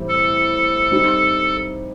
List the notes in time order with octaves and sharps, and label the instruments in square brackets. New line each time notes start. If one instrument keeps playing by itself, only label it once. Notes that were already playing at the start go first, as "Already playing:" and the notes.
Already playing: [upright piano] A2 E3 G3 C4
[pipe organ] A4
[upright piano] G3 C4 D#4